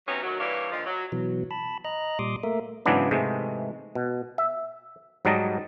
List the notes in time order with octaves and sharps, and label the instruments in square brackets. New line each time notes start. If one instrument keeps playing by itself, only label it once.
[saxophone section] C3 F#3 B3 C#4 D#4
D2 D#3 F#3
G2 E3 A#3 D4 C#5
A#2 D3 D#3 F3
F#3
[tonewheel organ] B2 E3 F#3
A5 B5
D#5 A#5 F#6
A#2 G3 C6 D6 D#6
A3 A#3 A#4 E5
[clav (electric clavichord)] G#2 C#3 E3 F#3 B3 D4
G#2 C3 E3 G#3 A3
B2
E5
G#2 F#3 G3 D#5 A5 A#5